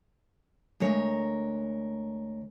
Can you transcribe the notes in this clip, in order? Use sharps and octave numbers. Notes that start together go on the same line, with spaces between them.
D2 G#3 A#4 C#5